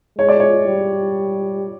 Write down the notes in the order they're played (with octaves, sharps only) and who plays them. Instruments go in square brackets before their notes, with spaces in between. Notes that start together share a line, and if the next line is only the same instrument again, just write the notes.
[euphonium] G#3 [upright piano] C#5
[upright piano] D5
C#5
[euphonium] G3